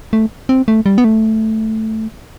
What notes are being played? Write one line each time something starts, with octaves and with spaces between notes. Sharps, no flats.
A3
C4
A3
G3
B3
A3